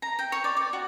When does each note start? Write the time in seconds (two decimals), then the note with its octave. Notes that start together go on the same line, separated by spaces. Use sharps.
0.02 A#5
0.19 G5
0.32 C#5
0.44 D5
0.57 D5
0.73 F#4